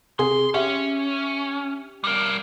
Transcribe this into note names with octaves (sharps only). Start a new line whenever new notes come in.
C3 G#4 C6
C#4 G4 E5
G3 A#4